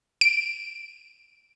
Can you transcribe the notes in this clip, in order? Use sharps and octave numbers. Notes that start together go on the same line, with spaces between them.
D7